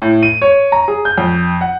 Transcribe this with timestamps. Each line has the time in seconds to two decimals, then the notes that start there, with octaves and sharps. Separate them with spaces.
0.02 A2
0.23 D#7
0.42 C#5
0.72 A#5
0.88 G#4
1.05 G6
1.18 F2
1.61 F#5